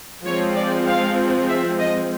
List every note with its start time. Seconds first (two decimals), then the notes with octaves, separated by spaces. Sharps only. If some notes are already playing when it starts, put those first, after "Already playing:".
0.25 F3 G#3 C4 C#5
0.56 D5
0.87 F5
1.49 E5
1.79 D#5